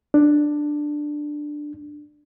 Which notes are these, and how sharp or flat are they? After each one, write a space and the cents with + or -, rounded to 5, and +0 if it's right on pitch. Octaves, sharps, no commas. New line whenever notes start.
D4 +10